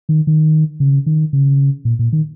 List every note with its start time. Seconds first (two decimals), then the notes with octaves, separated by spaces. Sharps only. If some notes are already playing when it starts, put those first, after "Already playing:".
0.09 D#3
0.27 D#3
0.80 C#3
1.06 D#3
1.33 C#3
1.85 A#2
1.99 A#2
2.13 D#3